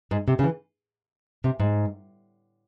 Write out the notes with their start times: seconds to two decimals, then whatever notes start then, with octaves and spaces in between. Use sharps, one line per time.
0.11 G#2
0.28 C3
0.39 C#3
0.44 E3
1.44 C3
1.60 G#2